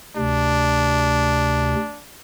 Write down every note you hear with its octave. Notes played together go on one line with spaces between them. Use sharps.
D2 C3 D4